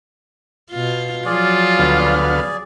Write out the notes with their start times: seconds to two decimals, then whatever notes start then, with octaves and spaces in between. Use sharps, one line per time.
0.71 B2 F4
1.26 F3 F#3 F4 G#4 D5
1.79 D2 B3 F5